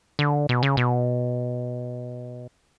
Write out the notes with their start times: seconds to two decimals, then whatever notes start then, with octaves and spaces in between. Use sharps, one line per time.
0.19 D3
0.49 B2
0.63 C#3
0.77 B2